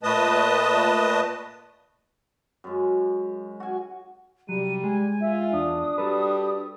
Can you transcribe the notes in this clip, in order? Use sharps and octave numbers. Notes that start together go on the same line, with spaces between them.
A#2 A3 B4 D#5 A5 D#6
F#2 G#3
F#4 G#5
C2 F#3 G3 D#7
G#3 G#5
F4 E5
E2 D4 D#6
G3 F#4 A4 B4